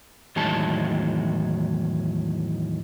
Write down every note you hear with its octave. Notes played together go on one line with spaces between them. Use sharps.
E2 A2 D#3 F#3 G#3 A5